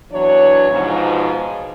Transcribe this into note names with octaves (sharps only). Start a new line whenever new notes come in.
E3 F#3 B3 D4 C#5
G#2 B2 F3